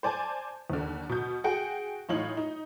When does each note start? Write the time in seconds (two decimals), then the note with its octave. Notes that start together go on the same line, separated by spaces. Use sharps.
0.03 C5 D5 G#5 A5
0.70 D#2 D3
1.09 B2 G6
1.44 F#4 G#4 F#5 G5
2.09 A2 E3 D#4 F4 C#5 F#7
2.37 D#4